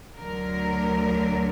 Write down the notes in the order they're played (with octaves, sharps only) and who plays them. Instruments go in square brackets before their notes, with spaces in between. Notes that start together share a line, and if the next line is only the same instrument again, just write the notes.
[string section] D2 D3 F#3 A#4